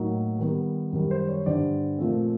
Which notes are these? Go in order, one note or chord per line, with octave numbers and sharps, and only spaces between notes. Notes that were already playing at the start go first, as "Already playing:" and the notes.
Already playing: A2 F#3 A#3 D#4
D#3 G3 B3
F#2 D#3 G3
C5
C#5
G2 D3 G3 C5 D5
A#2 F3 A3 C4